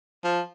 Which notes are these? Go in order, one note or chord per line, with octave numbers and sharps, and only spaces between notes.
F3